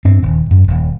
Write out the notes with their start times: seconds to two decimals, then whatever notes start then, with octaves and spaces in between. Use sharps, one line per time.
0.05 G2 C4 D4
0.22 D#1
0.51 F#2
0.68 D#1